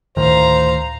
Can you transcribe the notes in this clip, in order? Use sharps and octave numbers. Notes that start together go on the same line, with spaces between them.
D2 A2 D#3 C5 F5 A#5